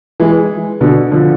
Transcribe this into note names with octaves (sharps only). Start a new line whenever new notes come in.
E3 G#3
B2 D3
D3 F3